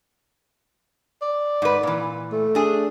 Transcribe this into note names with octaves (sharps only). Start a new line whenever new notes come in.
D5
G#2 B4
A#2 E3
A3
D4 G#4